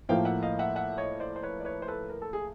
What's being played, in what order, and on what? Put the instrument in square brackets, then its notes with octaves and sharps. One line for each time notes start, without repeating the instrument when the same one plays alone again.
[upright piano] A2 F3 A#3 [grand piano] F5 G5
[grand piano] E5 F#5
D#5 F5
E5 F#5
E5 F#5
C#5 D#5
C5 D5
C5
B4 C#5
D5
B4 C#5
C5
A4 B4
A#4
A4
G#4